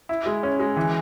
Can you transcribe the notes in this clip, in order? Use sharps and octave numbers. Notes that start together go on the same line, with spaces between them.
E4
G#3
C#4
G#3
E3